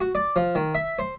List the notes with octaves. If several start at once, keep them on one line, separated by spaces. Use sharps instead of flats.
F#4
D5
F3
D#3
E5
C5